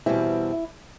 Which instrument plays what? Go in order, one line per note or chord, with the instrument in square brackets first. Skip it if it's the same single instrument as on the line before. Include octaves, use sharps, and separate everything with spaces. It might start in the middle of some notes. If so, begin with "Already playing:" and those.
[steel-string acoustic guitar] E2 B2 G3 C4 E4